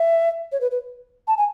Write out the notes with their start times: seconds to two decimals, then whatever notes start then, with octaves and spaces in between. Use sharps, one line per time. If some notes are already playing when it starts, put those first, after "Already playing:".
Already playing: E5
0.52 C#5
0.61 B4
0.71 B4
1.28 A5
1.38 G#5